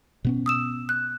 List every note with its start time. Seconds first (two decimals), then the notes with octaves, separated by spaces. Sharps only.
0.24 B2 B3 C#4
0.46 D#6 E6 E7
0.89 F#6